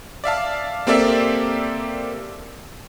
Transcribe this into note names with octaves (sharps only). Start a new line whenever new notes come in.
D5 E5 F5 A5
A#3 C4 G4 A4 D5 E5